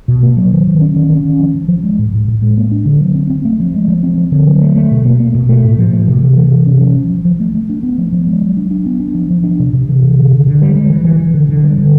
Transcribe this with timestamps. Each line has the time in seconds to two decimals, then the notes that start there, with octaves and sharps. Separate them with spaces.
0.08 B2
0.23 A#3
0.37 F#3
0.52 D#3
0.67 D#3
0.81 C#4
0.96 D#3
1.10 C#4
1.25 D#3
1.40 F3
1.55 F3
1.68 F3
1.84 G#3
1.99 A2
2.13 A2
2.28 A2
2.42 G#3
2.57 A#3
2.71 D4
2.86 D3
3.01 F#3
3.15 C4
3.30 C4
3.45 A3
3.60 F3
3.74 G#3
3.88 F3
4.03 C4
4.18 F3
4.32 D3
4.47 F#3
4.61 A3
4.76 A3
4.91 B2
5.05 A#3
5.20 A#3
5.35 B2
5.49 A3
5.64 A2
5.79 F3
5.93 A3
6.08 C3
6.22 E3
6.37 E3
6.52 C3
6.66 C#4
6.81 F3
6.96 F3
7.10 F3
7.25 F3
7.40 A3
7.54 A3
7.69 D4
7.83 B3
7.98 F3
8.12 F3
8.27 G#3
8.42 F#3
8.57 D4
8.71 D4
8.86 B3
9.00 D4
9.15 F3
9.30 F3
9.44 D4
9.60 C3
9.73 C3
9.89 E3
10.03 C3
10.17 D3
10.32 D3
10.47 D3
10.62 G3
10.75 G#3
10.90 E3
11.05 E3
11.20 E3
11.34 D3
11.49 D3
11.64 G3
11.78 D3